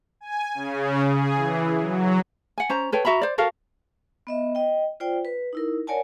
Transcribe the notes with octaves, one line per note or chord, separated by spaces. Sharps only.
G#5
C#3
G#4
E3
F#3
F#5 G#5
C#4 C5 A#5
A4 B4 C#5 G5
F#4 E5 A#5 B5
C5 D5
F#4 A4 A#4 F5
B3 D#5 E5
D#5 G5
F4 C5 D5 G5
B4
D#4 E4 A#4
A#4 C#5 D5 F#5 G#5 A5